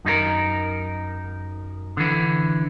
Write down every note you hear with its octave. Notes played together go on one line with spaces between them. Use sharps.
F#2 D#4 F4 A#4
D3 E3